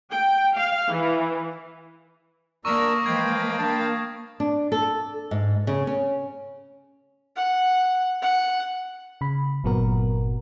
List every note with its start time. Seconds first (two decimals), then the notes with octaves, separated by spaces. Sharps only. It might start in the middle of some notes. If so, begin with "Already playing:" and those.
0.10 G5
0.55 F5
0.89 E3
2.65 A#3 D4 A#4 C#6 D#6 E6 A#6
3.06 E3 F3 G#3 F5 G5 B5 G#6
3.58 D4 A#4 A5
4.40 D4
4.72 A4
5.31 G#2
5.67 C#3
5.87 C#4
7.37 F#5
8.22 F#5
9.21 C#3 B5
9.64 G1 A#2 F#3 B3 F#4 A#4